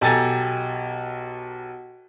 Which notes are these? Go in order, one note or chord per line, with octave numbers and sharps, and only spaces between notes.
B1 G4 A4 G#5 A#5 A6